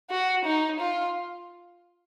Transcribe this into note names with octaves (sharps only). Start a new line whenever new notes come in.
F#4
D#4
F4